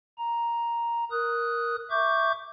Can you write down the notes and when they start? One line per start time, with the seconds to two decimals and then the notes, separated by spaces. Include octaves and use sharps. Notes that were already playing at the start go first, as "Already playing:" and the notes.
0.18 A#5
1.11 A#4 D#6 F#6
1.90 E5 C#6 D6 G6